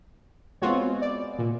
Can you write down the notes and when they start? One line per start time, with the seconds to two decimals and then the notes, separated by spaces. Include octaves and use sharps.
0.62 G#3 B3 C4 F4 F#4 C#5
1.02 D5
1.39 A#2